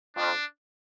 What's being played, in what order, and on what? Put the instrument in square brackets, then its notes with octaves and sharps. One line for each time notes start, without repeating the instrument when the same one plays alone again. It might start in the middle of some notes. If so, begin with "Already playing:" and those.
[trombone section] F2 [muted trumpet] D4